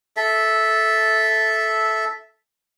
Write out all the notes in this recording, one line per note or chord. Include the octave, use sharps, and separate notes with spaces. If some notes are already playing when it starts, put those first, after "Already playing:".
A4 E5